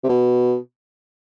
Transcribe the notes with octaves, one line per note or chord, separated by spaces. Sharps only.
C3
B2